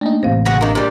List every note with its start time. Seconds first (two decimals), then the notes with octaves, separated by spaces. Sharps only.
0.01 A3 A#3 D4 D#4
0.23 A1 C3 C5 F5
0.45 C#3 C#4 F#4 A#6
0.61 D#3 A#3 D4
0.75 A#2 G3 G4 D5